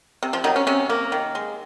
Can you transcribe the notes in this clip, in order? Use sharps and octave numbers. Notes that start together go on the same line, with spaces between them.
C3
F3 F4
D#3 F#3 D#4
C#4
C3 C#4
A#3
D#3
G#3